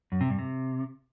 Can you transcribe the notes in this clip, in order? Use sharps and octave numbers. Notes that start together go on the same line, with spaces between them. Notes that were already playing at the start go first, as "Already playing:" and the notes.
F#2
C3
G2
C3